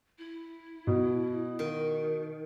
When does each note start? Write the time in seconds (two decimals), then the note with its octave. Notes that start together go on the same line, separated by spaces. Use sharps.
0.19 E4
0.87 B2
1.59 D#3